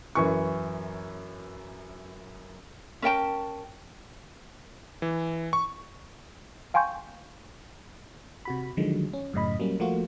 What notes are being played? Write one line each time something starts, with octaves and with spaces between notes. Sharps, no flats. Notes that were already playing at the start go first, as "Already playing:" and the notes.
F#2 E3 C#6
C#4 A#4 G5 A5
E3
C#6
F5 G5 G#5 C6 C#6 G6
C3 F#4 B5
D3 D#3 F3 F#3 G#3
C#4
F#2 A2 C#3 D#5 B5
F#3 G3 A#3 C#4
F3 A3 A#3 F4 F#4